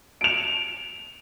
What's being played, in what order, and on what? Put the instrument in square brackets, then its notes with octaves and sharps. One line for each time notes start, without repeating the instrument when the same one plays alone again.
[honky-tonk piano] D7 F7